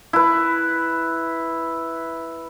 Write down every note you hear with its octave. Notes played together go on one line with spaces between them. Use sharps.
E4 B4